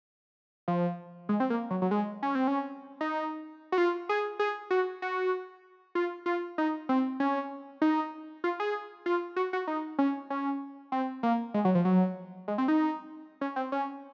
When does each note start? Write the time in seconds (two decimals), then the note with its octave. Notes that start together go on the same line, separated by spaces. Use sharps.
0.68 F3
1.29 G#3
1.40 C4
1.50 A#3
1.70 F#3
1.82 F#3
1.91 G#3
2.23 C#4
2.35 C4
2.47 C#4
3.01 D#4
3.72 F#4
3.78 F4
4.09 G#4
4.39 G#4
4.70 F#4
5.02 F#4
5.95 F4
6.26 F4
6.58 D#4
6.89 C4
7.20 C#4
7.82 D#4
8.44 F4
8.60 G#4
9.06 F4
9.36 F#4
9.53 F#4
9.67 D#4
9.98 C#4
10.30 C#4
10.92 C4
11.23 A#3
11.54 G#3
11.65 F#3
11.75 F3
11.85 F#3
12.48 G#3
12.58 C4
12.68 D#4
13.41 C#4
13.56 C4
13.72 C#4